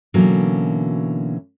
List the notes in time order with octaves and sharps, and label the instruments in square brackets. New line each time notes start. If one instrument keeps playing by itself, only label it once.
[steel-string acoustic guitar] B2 D3 E3 F#3 A#3 C#4